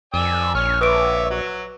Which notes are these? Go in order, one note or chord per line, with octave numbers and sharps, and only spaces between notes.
F2 D5 G#5 E6
A#1 C#5 F6
B4 C#5 E5 D6 D7
F#3 F#4